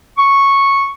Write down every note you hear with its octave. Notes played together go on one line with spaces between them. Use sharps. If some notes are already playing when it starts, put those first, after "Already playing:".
C#6